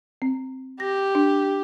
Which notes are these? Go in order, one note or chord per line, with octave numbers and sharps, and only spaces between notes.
C4
G4 A#6
D4